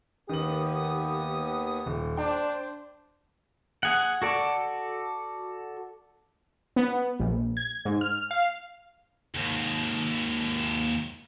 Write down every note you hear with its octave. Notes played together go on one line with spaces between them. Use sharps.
D#2 D#3 B3 G4 D#6 F#7
D#1
D4 C5 G5
G#4 F#5
F#4 A4 D5
B3
A#1
G#6
G#2
F6
F5
D#2 G#2